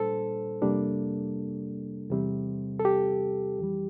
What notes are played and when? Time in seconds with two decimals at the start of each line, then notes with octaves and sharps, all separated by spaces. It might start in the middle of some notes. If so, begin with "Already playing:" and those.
Already playing: A#2 G3 D4 A4 C5
0.62 F2 C3 G3 A#3 D4
2.10 E2 C3 G3 C4
2.79 A4
2.85 G4
3.58 F2 E3 G3